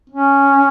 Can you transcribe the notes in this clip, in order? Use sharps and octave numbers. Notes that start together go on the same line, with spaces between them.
C#4